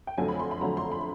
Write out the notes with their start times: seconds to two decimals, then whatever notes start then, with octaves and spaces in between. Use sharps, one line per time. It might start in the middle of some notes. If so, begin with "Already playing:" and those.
0.07 G5
0.18 F2 D3 F#3 A3 G#5
0.28 B5
0.39 C6
0.51 B5
0.61 F2 D3 F#3 A3 A#5
0.77 C6
0.92 B5